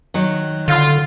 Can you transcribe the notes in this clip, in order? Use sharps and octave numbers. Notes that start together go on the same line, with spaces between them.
D#3 F#3
D3 F4